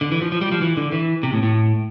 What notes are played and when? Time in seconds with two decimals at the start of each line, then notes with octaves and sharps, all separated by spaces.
0.01 D3
0.12 E3
0.22 F3
0.32 F3
0.41 G3
0.52 F3
0.62 E3
0.77 D3
0.92 E3
1.23 C3
1.33 A2
1.43 A2